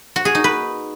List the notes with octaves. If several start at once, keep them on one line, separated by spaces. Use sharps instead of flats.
F#4
G#4
D#4
B4